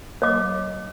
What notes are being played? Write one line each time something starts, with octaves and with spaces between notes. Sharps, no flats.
C#5 D#5 D6